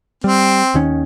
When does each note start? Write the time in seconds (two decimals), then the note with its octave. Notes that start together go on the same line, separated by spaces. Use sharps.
0.24 G3 C4
0.74 D#2 D#3 C#4